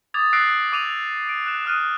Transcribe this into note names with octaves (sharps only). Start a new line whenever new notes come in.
D6 D#6 G#6 A6 F7
E6 F#6 A#6 C7 D7
D6 D#7 F7
D7
F#6 E7
D#6 F6 F#6 D#7